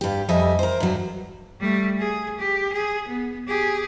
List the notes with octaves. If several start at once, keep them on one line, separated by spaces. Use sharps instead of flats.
G2 G4
F2 G3 D#5 E5 G#5
A#4 C5
G2 F#3
G3 A3
G#4
G4
G#4
B3
G4 G#4